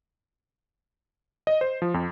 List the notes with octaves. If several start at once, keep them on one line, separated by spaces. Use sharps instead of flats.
D#5
C5
F3
F2